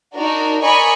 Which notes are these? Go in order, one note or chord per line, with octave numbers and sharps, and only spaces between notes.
D4 D#4 F#4 A#4
A#4 D5 D#5 G#5 B5 C#6